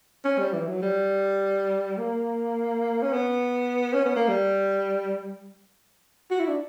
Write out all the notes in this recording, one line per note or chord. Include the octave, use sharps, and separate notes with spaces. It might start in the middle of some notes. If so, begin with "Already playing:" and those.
C#4
G3
E3
F#3
G3
A#3
C#4
B3
C#4
B3
A#3
G3
F#4
E4
D4